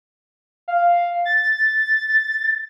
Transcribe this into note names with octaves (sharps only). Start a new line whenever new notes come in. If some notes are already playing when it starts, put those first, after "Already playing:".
F5
A6